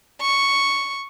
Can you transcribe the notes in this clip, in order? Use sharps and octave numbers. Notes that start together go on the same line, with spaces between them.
C#6